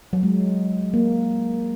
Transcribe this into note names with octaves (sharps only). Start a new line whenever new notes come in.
F#3
G#3
A#3